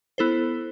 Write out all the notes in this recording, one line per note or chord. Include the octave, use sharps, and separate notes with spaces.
B3 E4 A4 C5